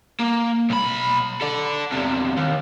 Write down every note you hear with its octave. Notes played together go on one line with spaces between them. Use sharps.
A#3
B1 B5
A4 D5
E2 C3
D#2